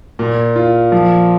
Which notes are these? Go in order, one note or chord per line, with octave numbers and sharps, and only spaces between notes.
A#2
F4
F3